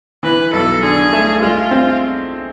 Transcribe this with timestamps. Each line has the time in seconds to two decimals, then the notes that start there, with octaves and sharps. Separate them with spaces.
0.23 E3 B4
0.53 B1 A4
0.83 D3 G#4
1.13 A3
1.41 G#3 F4
1.71 C4